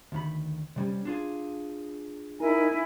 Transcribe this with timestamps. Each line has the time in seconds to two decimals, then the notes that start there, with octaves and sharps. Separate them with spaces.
0.12 D2 D#3 B5
0.76 C3 G3 C#4
1.05 D4 F4 G#4
2.40 D#4 E4 A#4 G#5